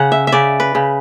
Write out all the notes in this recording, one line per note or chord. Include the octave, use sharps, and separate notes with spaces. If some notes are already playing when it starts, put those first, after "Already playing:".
Already playing: C#3 F#5
E5
E5
C#3 D5
B4
C#3